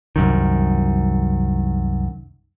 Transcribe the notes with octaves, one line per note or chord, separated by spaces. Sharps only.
C2 F#2 D#3